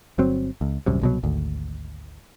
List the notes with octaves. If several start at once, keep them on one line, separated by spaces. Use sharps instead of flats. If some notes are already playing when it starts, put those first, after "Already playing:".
G1 F#3 C4
C#2
D#1 C2 F#2 C3
C2 B2 F#3
G#1 D2